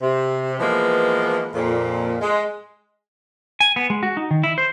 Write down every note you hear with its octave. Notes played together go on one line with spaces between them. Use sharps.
C3
E3 F3 G#3 A#3 B3
F2 A#2
G#3
G#5
B3
G#3
F#4
D#4
D#3
E4
C5